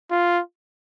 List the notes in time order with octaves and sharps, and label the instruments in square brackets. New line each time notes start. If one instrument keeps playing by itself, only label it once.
[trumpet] F4